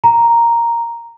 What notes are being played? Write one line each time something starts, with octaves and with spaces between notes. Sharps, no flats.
A#5